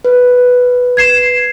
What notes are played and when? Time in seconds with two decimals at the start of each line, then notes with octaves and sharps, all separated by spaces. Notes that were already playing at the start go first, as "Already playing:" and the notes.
0.05 B4
0.97 G#6 C7 E7